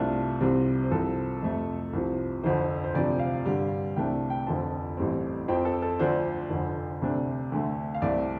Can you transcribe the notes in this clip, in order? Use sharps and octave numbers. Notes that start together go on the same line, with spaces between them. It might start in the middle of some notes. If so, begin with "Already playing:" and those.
Already playing: C2 C3 A3 D4 F4
C2 C3 G3 C4
C5
C2 C3 F3 A4
F2 C3 A3
C2 C3 F3
F1 F2 D3 F3 C5
C5
D2 C3 F3 D5
F5
G2 D3 G3
C2 C3 A3 D4 G5
G5
F1 F2 D3 F3 C4 A5
A1 A2 G3 C4
F2 F3 C4 G5
A4
A4
D2 D3 F3 D4 C5
F1 F2 D3
D2 C3 A3 D4
D2 D3 A3
F5
C2 C3 A3 C4 D5